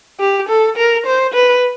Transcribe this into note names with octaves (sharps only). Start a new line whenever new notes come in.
G4
A4
A#4
C5
B4